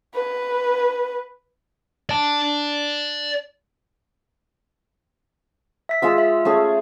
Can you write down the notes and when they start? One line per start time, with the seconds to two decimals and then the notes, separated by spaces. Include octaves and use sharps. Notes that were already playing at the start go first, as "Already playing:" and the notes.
0.14 B4
2.09 D5 A5
5.89 E5 B6
6.02 G#3 F4 E6
6.18 E5
6.45 A3 C#4 G#4